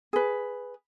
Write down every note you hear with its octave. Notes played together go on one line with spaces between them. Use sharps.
G#4 B4